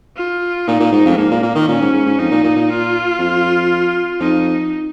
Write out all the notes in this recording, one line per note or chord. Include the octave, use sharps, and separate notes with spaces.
F4
A#2 D#4
A#2
G#2
F2
G#2 A#3
A#2
A#2
D#3
A#2 C#4
G#2
G#2
G#2
F2 D#4
A#2
A#2
A#2
F4
F2
F2 D#4